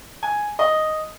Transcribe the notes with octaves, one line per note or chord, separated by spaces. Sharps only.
G#5
D#5